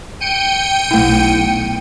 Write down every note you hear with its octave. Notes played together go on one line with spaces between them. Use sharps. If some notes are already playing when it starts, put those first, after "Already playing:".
G5 C#7 D#7
B1 A3 E4